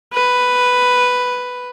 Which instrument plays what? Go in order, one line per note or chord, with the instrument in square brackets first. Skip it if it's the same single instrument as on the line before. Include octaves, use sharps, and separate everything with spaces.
[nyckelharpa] B4